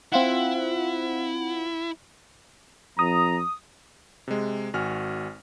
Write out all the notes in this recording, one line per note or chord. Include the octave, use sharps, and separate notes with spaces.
C4 E4 F4 F#5
F2 A#5 D#6
C3 G#3
G#1 F#4 G#5 F6